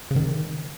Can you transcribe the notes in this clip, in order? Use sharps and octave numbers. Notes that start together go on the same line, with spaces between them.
C#3
D#3